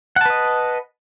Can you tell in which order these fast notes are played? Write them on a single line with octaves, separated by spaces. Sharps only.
F#5 A5 B4 D#5